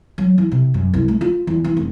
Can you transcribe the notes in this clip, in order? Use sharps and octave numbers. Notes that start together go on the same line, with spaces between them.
F#3
E3
C3
F#2
C2
A3
F4
E2
E3
F1